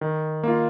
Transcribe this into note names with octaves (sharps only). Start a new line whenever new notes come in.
D#3
A#3 F4